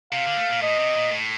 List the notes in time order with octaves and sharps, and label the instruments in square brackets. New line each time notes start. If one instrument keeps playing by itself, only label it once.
[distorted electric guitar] C3 [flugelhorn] F5
[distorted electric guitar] D3
A3
A#2
[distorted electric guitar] A2 [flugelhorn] D#5
[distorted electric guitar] C3
A#2
A2